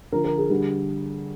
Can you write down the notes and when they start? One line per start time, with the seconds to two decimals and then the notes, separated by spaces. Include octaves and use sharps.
0.12 D3 F3 A#4
0.25 A#4
0.38 G#4
0.50 D3 G3